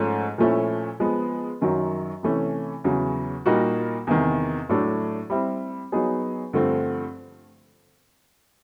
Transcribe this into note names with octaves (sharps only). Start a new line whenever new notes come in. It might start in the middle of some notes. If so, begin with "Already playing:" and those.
Already playing: G#2 F3 A3 C#4
A#2 F3 A3 C#4 E4
F3 G#3 B3
F#2 D#3 F#3
C3 E3 A3 C#4
E2 C#3 F#3
A#2 G3 A#3 D#4 F#4
E2 C3 D#3
A2 F#3 A3 D4
G3 C4 E4
F#3 B3 D#4 G#4
G2 D3 F3 A3 C4